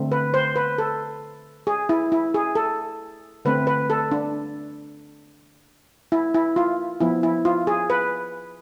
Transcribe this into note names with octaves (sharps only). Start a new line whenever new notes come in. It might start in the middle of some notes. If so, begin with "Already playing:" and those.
Already playing: D3 A3 C4
B4
C5
B4
A4
G#4
E4
E4
G#4
A4
D3 A3 C4 B4
B4
A4
D4
E4
E4
F4
F3 B3 E4
E4
F4
G#4
B4